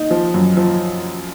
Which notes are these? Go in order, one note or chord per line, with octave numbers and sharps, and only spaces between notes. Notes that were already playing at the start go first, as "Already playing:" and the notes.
Already playing: D#4
F3
F#2
F3